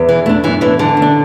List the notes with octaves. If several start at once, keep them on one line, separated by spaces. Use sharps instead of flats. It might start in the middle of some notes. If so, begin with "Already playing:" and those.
Already playing: E2
E3
A3 D4
F#2 E3
E3 A3 D4
D3 E3
A3
D4